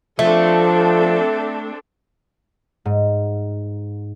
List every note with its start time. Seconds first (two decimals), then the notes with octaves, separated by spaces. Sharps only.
0.19 F3 A3 C4 D4 A4
2.85 G#2